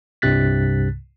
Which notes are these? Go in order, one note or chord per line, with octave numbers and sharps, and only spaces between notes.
C2 G2 C3 F#6 A6 B6